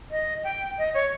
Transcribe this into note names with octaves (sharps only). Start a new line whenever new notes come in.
D#5
G5
D#5
C#5